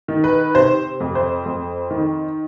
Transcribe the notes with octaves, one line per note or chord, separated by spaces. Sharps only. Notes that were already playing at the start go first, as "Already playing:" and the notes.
D#3
B4
C3 C5
F2
C5
F2
D#3